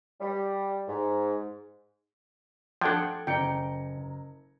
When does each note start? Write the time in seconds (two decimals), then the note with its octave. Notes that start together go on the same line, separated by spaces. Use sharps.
0.21 G3
0.88 G#2
2.81 F3 D4 A4 F#5 G5 D6 G#6
3.27 F#1 G5 A#5 C#7